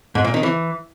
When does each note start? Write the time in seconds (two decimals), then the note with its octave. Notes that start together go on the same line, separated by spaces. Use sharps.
0.15 G#2
0.25 A#2
0.34 D#3
0.43 E3